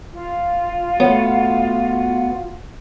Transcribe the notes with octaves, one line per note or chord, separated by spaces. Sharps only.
F4
A3 B3 F#4 C#5